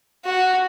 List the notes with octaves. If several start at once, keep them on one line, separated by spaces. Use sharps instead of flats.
F#4